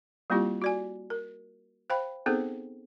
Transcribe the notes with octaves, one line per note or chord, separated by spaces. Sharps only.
G3 A#3 C4 E4 F4 G4
F#4 D5 G#5
A#4
C5 F5 G5 B5
B3 C4 D#4 G#4 A4 C5